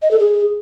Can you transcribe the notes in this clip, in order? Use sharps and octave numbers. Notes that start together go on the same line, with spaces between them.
D#5
A4
G#4